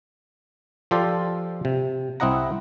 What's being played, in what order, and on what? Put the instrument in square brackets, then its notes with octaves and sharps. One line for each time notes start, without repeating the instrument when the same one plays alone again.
[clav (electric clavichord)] F3 F4 G4 A4 C5 D5
C3
C2 C4 E4 D#5 F#5 A#5